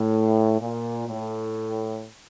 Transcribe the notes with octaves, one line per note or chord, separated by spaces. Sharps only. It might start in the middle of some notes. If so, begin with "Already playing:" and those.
Already playing: A2
A#2
A2